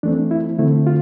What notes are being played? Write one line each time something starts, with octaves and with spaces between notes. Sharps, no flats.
E3 A3 C4 D4
E4
D3 A3 C4 E4
F4